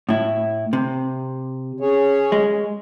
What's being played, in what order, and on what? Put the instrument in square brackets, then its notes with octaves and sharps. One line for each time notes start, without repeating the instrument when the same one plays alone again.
[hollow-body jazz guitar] A2 E4
C3
[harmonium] C#4 G#4 C#5
[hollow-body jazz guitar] G#3